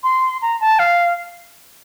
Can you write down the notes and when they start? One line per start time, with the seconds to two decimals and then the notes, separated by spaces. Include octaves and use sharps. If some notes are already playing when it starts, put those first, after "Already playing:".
0.04 C6
0.42 A#5
0.61 A5
0.79 F5